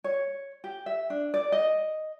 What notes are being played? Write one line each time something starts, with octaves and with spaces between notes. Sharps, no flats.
C#5
G4
E5
D4
D5
D#5